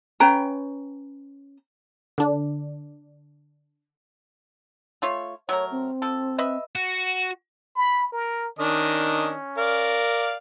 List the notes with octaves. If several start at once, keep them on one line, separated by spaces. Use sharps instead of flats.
C#4 B4 G5 A#5
D3 D4
A3 F4 C#5
F#3 A3 A#4 C#5
C4
F3 A4
B4 D#5 E5
F#4
B5
A#4
D#3 C#4 D4 D#5
A#4 D5 F5